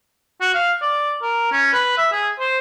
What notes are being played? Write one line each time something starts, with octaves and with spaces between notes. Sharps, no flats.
F#4
F5
D5
A#4
C#4
B4
E5
G#4
C5